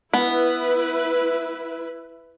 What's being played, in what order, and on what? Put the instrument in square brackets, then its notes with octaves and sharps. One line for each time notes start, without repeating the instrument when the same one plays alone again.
[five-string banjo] B3 [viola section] E4 B4